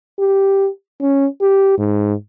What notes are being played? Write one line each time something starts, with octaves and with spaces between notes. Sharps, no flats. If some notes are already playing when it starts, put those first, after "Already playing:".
G4
C#4
G4
G#2